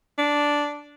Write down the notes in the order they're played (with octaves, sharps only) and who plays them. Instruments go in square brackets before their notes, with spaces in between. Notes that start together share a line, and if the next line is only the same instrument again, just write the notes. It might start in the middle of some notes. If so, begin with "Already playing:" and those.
[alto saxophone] D4